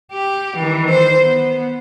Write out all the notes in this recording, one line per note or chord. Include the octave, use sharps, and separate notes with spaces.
G4
D#3 E3
C5
B3